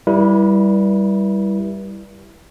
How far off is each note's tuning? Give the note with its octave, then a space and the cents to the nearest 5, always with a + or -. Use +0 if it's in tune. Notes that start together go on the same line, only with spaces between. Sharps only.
G3 +0 E4 +0 B4 -40